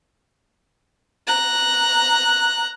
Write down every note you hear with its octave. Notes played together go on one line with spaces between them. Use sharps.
A#5 F#6